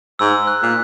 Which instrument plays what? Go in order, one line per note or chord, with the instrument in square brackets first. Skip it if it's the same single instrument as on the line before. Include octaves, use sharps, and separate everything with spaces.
[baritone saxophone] G#2 [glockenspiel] E6
[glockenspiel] F#6
[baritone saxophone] A#2